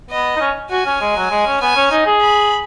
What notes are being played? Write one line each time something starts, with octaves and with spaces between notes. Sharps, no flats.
B3 D#5
D#4
C#4
F#4 G#5
C#4
G#3
F#3
G#3
C#4
B3 G#5
C#4
D#4
G#4
B5